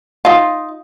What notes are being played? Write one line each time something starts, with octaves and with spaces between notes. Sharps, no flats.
D#4 F4